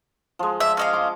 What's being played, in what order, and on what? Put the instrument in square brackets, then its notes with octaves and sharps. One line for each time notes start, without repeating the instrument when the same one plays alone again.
[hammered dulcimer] F3 G#3
[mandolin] E5
C#4 D#5 F5
[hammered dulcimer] D6